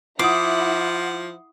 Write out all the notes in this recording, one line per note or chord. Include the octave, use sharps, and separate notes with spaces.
F3 E4 F#5 D6 D#6 C7